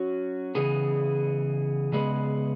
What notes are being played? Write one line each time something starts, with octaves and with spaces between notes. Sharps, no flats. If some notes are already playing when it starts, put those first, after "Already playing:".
Already playing: F#3 C#4 F#4
C#3 E3 B3 G#4
C#3 G#3 B3 G#4 B4